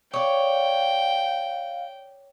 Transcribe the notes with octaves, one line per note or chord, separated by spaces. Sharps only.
C#5 D5 F5 G5